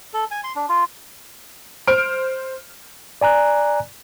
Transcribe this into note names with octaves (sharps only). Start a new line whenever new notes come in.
A4
G#5
C6
D4
F4
C5 F6 D7
D5 G#5 A#5 F#6